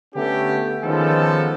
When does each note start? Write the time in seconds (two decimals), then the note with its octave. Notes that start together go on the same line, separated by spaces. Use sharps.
0.15 D3 A3 B3 C#4 G4
0.84 D#3 F3 G#3 B3 C#4 A4